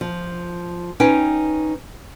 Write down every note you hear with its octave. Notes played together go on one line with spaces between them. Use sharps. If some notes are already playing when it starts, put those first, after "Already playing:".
F3
C#4 D#4 B4 G5 G#5